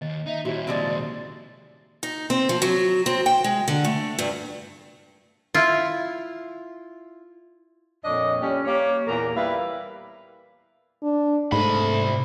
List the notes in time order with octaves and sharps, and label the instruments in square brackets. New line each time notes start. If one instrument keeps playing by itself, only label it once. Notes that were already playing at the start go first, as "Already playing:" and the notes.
[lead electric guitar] D#2 [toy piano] D#5
[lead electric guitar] D#4 [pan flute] E5
[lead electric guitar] D#2 A#2 [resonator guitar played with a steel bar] E4 [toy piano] F#4 G4 C#5
[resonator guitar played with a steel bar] C3 F3 G#3 [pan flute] D5
[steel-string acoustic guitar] D#4
C4
F3
F#3
C4
G5
G#3
D3
A3
G2
[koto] E4 F4
[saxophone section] F2 A#2 D4 C#5 D#5
G3 C#4
A#3 G4 C#5
E2 A#2 A#3 A#4
G3 E4 B4 F5
[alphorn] D4
[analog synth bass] G#2 [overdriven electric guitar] C3 B5 [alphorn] A3